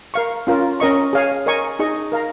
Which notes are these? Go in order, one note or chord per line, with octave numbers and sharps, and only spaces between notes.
A#4 F5 C#6
C#4 F4 A#4
C#4 A#4 D#5 C#6
G#4 C#5 F5 G#5
A#4 D#5 G#5 C#6
D#4 G#4 D#5 C#6
A#4 F5 A#5